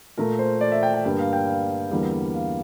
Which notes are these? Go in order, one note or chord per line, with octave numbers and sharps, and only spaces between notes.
A#2 A3 A#4
C5
D5
E5
G5
G5
G2 D3 G3 A#3 G5
F5
G5
F5
E2 D3 G3 A#3
F5